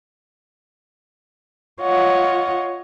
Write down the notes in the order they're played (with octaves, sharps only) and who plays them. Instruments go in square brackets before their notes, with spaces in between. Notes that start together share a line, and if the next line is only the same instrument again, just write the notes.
[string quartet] F4 C#5 D#5 F#5